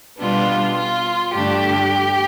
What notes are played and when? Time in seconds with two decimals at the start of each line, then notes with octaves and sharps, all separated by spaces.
0.19 B2 G3 B3 D4 F4
0.77 F4
1.33 G2 D3 A3 D4 G4